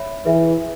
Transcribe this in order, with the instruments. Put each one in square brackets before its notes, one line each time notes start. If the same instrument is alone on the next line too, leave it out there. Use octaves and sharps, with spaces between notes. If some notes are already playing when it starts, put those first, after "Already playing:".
Already playing: [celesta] C#5 E5 B5
[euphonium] E3 [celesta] G#4 B4 E5